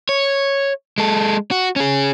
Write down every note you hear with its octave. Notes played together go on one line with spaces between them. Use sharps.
C#5
G#3 A4
F#4
C#4 G#4